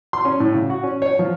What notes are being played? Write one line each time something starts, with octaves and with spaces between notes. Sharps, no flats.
C6
C#4
A2
C#3
F#4
C#4
C#5
F3